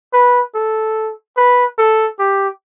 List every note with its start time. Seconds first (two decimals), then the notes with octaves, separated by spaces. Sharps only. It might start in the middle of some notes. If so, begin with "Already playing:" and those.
0.13 B4
0.55 A4
1.37 B4
1.78 A4
2.19 G4